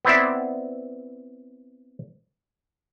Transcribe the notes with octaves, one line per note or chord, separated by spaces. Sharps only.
B3 C4 E4 D5 E5